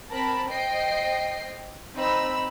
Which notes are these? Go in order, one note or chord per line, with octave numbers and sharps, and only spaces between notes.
C4 A#4 A5 B5
C5 D#5 G5 C7
C4 D#4 B5 E6